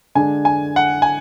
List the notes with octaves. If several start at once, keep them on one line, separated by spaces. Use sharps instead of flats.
D3 G#3 D4 G#5
G#5
F#5
G#5